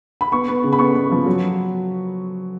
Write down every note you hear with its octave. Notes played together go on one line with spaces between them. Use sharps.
B5
B3 C#6
B3
C#3
B5
B3 C#6
B3
F3
F#3